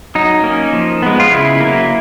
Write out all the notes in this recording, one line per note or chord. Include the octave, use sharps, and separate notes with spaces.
F#3 D#4
A#3 C#4
F3
G#3 B3
F4
C#3 E4
F#3 A#3